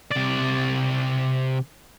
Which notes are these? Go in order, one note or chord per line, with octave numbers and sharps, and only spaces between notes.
C3 D5